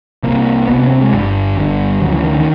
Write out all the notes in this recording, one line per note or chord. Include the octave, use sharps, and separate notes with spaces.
C2 C3 A#3
C2 C3 B3
B3
C#4
C4
G#3
G1 G2 D3 G3
G1 G2 D3
D2 C#3 F#3
E3
D#3
D#3